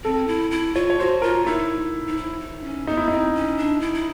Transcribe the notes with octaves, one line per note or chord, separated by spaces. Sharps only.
C4 A4
E4
E4
F4 C#5
C#5
F#4 C5
F4 A#4
D#4 E4
D#4
E4
D#4
C#4
B3 D#4
E4
C4 D#4
C#4
D4
E4
E4